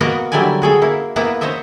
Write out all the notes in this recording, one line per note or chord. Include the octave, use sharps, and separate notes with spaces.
A#3 B3 F#4 A#4 D#5 F#5
D3 F#3 G3 E4 D5 G#5
F#4 G#4 A4
A#3 E4
A#3 B3 E4 B4 A#5
C5 C#5 D#5 E5